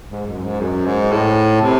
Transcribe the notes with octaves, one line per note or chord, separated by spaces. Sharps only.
G#2
F#2
G#2
F#2
G#2
A2
C3